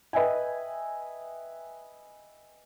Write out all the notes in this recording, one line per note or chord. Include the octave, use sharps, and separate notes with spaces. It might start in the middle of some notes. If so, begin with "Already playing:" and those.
B4 D#5 E5 G5 G#5